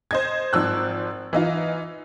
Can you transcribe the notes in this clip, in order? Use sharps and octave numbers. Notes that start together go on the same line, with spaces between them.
C5 D#5 G#6
G#1 F3 E6 F#6
E3 D#4 F4